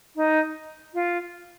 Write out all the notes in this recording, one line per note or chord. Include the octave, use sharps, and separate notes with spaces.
D#4
F4